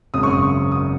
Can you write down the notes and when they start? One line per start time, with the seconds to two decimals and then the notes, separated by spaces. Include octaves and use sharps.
0.14 G#1 F#2 C#3 D#6
0.23 C#6
0.33 D#6
0.42 C#6
0.72 D#6